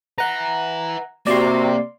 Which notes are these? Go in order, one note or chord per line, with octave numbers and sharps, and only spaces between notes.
B4 E5 F#5 A#5
C3 A#3 F#4 D5 C6